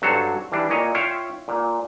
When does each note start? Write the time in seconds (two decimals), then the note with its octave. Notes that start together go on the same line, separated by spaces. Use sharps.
0.02 G2 F#3 F#4 A4 C5 C#5
0.52 E3 G3 D4
0.70 A#2 C#5 D#5
0.95 F4 C#5 E5 F5 G5
1.48 A#2